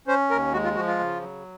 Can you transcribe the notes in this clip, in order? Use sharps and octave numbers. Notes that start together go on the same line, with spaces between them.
C#4 C5
D#2 A#4
G#3 F#4
F4
F3 F#4
F4
C#3
F#3